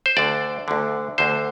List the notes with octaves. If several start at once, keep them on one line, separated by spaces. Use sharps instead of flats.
C5
D2 D3 D5
D2 D3
D2 D3 C5